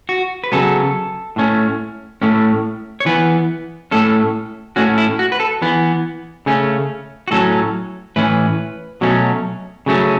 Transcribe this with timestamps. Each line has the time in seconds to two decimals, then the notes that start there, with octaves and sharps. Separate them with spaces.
0.09 F#4
0.44 B4
0.52 C#3 F#3 B3 A4
1.36 A2 A3 C#4
2.22 A2 A3 C#4
3.00 C#5
3.06 E3 B3 B4
3.91 A2 A3 C#4 A4
4.76 A2 A3 C#4 F#4
4.98 E4
5.19 F#4
5.32 B4
5.40 A4
5.62 E3 B3
6.46 C#3 A3 C#4
7.28 F#4
7.31 A2 F#3 C#4 A4
8.16 A2 E3 C#4 B4
9.01 B2 F#3 A3 C#4
9.86 C#3 F#3 A3 C#4